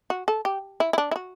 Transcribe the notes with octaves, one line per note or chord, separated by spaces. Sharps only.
F#4
A4
G4
E4
E4
D4
E4
F#4